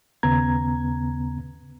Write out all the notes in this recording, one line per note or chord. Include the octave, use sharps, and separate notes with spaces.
D#2 C#3 B3 A#5 G#6